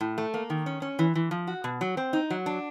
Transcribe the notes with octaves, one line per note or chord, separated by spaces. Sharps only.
A2
A3
A#3
D#3
C#4
C#4
E3
E3
F3
F#4
B2
F#3
C4
D#4
F#3
D4